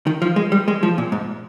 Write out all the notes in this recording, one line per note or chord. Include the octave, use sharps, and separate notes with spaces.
D#3
F3
G#3
G3
G#3
F3
A#2
G#2